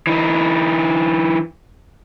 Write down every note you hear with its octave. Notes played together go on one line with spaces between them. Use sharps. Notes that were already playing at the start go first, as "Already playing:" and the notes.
E3 D#4